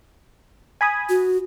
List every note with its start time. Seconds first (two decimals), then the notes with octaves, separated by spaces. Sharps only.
0.81 G#5 B5 D#6
1.09 F#4